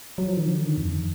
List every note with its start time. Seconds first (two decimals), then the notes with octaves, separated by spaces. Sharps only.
0.18 F#3
0.27 F3
0.37 D#3
0.47 D3
0.61 D#3
0.78 F2